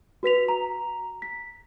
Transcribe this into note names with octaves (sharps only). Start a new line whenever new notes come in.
F#4 B4 B6 F7
A#5
B6